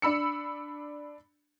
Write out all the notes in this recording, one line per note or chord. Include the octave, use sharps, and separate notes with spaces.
D4 B5 E6 C#7